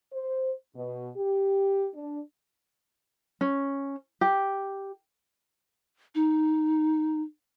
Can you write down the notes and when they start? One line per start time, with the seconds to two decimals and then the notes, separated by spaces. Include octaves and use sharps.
0.13 C5
0.76 B2
1.16 G4
1.94 D4
3.41 C#4
4.21 G4
6.15 D#4